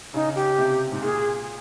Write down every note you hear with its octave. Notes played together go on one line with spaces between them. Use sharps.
C#3 D#4
G4
C3
G#2
A#2 G#4